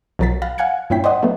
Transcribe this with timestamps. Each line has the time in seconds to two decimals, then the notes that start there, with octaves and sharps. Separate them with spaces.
0.19 B1 F3 F#3 A#4 A6 B6
0.42 F5 B5 F#6 A6 A#6
0.58 F5 F#5 G#5 F#6 G#6 C#7
0.90 G2 A#2 C#4 E4 G5 B6
1.04 C5 D5 D#5 F#5
1.23 F#3 A3 B3